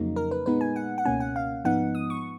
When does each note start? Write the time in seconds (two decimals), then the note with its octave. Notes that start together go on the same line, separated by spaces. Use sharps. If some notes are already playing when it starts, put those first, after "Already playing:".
Already playing: F2 C#3 F#3 A#3 D#4
0.16 A#4
0.31 B4
0.46 A#2 G#3 B3 D#4 B4
0.61 G#5
0.76 F#5
0.98 F#5
1.05 C#2 B2 A#3 C#4 G#5
1.20 F#5
1.36 F5
1.65 G#2 F3 B3 D#4 F#5
1.95 D#6
2.10 C#6